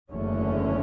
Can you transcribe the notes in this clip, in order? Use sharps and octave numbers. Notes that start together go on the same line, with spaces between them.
F#1 E2 D3 A3 C#4